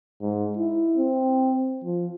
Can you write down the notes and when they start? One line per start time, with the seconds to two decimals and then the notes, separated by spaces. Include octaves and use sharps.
0.21 G#2
0.57 E4
0.97 C4
1.84 F3